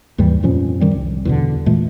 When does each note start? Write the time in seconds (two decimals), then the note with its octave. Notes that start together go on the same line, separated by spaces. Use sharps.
0.18 D#2 G#2 E3 G3
0.43 F2 A#2 F3 C#4
0.80 F#2 D#3 G3 C4
0.95 C2
1.25 E2 B2 D3
1.66 A#2 E3 G#3 A3